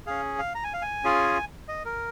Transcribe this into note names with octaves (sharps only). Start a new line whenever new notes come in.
C#4 G#4 F5
F5
A#5
G#5
F5
G#5
C#4 F4 G#4
D#5
A#4